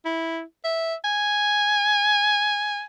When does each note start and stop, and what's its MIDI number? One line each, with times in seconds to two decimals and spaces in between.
0.05 0.41 64
0.65 0.95 76
1.04 2.83 80